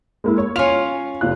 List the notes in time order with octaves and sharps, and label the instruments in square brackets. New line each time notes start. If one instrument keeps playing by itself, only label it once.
[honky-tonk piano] G#3 A#3 E4
C#5
[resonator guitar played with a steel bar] C#4 F4 [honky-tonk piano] F7
[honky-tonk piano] F1 F4 F#6